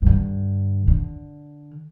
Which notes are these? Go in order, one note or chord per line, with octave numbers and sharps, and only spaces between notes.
G2 D3
D3